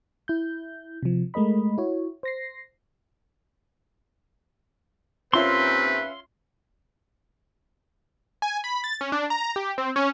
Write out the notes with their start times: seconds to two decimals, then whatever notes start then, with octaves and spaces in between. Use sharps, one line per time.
0.28 E4 G6
1.03 C3 F3
1.34 G#3 A3 A#4 D#5 B5
1.78 E4 F#4 C#5
2.23 C5 A#6 C7
5.34 D#2 C4 C#4 F4 B4 E5 C6
8.42 G#5
8.64 B5
8.84 A6
9.01 C#4
9.12 D4
9.30 A#5
9.56 G4
9.78 C4
9.96 C#4